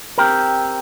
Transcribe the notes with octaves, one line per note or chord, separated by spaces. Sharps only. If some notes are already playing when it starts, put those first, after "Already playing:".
C4 G4 A#4